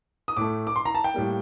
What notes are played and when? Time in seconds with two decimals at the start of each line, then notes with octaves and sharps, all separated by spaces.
0.28 D#6
0.37 A2 A3 D6
0.67 D6
0.76 C6
0.85 A#5
0.95 A5
1.04 G5
1.14 A2 G3 A#3